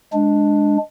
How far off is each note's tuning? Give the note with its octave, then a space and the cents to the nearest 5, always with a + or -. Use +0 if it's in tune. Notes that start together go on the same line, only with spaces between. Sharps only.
G#3 +0 D4 +0